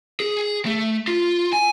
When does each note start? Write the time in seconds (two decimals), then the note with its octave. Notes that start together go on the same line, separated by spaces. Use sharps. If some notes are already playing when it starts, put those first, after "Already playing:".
0.20 G#4
0.65 A3
1.08 F4
1.53 G#5